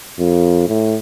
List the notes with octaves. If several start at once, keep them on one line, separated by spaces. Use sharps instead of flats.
F2
A2